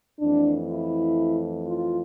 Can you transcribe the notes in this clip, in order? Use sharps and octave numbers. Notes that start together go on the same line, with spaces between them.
F2 E3 A3 D4
E4
F4